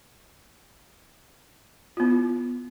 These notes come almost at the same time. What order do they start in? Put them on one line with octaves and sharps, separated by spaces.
F4 B3 E4